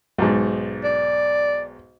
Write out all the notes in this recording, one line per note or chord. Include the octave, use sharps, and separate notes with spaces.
B1 G#2
D5